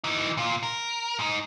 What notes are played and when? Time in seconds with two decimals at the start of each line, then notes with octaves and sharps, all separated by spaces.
0.04 E3 D#4
0.37 A#2 F4
0.63 A#4
1.19 G#2 D#4